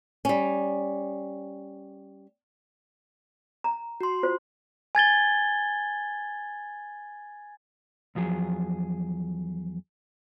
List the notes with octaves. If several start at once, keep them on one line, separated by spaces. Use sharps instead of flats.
G3 C#4
A#5
F#4 C6
F4 C5
G#5 G#6 A6 G7
E2 F3 F#3 G#4